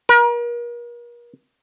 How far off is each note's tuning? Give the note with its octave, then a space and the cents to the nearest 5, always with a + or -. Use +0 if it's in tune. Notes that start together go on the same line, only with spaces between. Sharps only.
A#4 +40